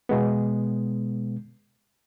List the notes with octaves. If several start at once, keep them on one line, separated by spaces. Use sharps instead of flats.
B2 G#3 B3